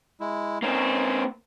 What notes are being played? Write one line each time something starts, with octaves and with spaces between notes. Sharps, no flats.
G#3 E4
A#3 C4 C#4 D#4 C#5